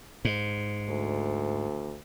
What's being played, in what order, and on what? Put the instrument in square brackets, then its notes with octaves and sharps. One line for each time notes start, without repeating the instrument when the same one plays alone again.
[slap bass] G#2
[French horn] D2